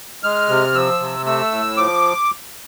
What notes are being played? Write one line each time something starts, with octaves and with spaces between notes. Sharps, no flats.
G#3 F6
C3
F3 E6
C3
A3 E6
A2
F3 D6